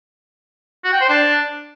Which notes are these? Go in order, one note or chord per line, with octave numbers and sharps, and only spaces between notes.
F#4
G5
C5
D4